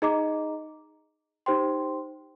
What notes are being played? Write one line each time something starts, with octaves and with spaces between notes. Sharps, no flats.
D#4 G#4 D#5 A#5 D6
D#4 G4 C5 G5 C6